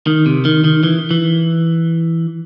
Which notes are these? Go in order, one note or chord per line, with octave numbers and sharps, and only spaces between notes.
D#3
C3
D#3
D#3
E3
E3